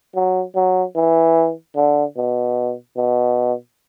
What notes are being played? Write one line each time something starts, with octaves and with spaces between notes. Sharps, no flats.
F#3
F#3
E3
D3
B2
B2